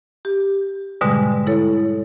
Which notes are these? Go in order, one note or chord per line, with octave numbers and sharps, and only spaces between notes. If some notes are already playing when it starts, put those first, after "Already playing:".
G4
G#2 B2 D3 G3 G#3
E4 A4 C#5